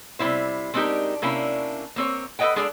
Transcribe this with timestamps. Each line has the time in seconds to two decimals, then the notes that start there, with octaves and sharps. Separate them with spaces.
0.19 C3 F3 G3 E4 C5
0.74 G#3 C4 D4 D#4 G4 A#4
1.22 C3 A#3 C#4 D4 E4
1.96 A#3 C4 C#5
2.39 A4 B4 C#5 D#5 F#5 G5
2.56 G#3 D4 G#4 A4 D5